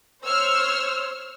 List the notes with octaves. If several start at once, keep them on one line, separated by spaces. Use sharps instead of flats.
C5 C#5 E6 F6